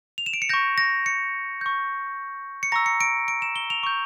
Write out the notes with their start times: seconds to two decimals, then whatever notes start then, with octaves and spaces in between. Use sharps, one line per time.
0.18 F7
0.26 E7
0.34 D7
0.42 C#7
0.49 C#6 G6 A#6
0.78 A#6
1.06 C#7
1.61 C#6 G6
2.63 C#7
2.72 A#5 C#6 E6 A#6
2.86 C#7
3.01 D7
3.28 D7
3.42 E7
3.56 G7
3.70 F7
3.83 C#6 G6